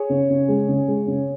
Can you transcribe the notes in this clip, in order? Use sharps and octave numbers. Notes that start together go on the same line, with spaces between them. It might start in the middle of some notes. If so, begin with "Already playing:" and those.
Already playing: G#4 C#5
C#3
C#3
G#3
C#3
G#3
C#3